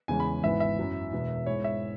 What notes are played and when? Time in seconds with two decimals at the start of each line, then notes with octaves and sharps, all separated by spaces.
0.08 E2 C#3 E3 G#3 C#4 G#5
0.20 B5
0.43 G#1 G#2 E3 B3 E4 E5
0.60 E5
0.78 F#2 F#3 E4
1.12 E1 E2 B2 B3
1.46 G#2 G#3 B3 E4 C#5
1.64 E5